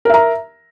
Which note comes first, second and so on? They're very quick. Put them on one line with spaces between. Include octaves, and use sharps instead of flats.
A#4 E5 A#5